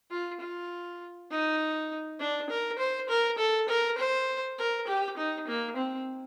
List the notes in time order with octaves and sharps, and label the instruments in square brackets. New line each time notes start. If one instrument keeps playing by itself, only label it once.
[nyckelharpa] F4
F4
D#4
D4
A#4
C5
A#4
A4
A#4
C5
A#4
G4
D#4
A#3
C4